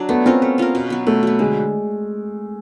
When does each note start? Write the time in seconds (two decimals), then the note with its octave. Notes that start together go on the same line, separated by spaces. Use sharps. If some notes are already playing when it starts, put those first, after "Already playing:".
Already playing: F#3 D4
0.09 A3 B3
0.26 C4 C#4 F4 A#4
0.42 A3
0.58 C#4 F4 A#4
0.75 B2
0.90 F#3 B3
1.07 B2 A3
1.23 F#3 B3
1.39 D3 G#3